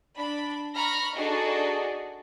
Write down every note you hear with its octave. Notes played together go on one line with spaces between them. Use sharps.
D4 B5
A#5 B5 C#6 F6 A#6
D4 D#4 F#4 G#4 A4 D5